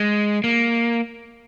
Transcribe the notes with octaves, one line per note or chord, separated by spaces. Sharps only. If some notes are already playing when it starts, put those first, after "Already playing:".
Already playing: G#3
A#3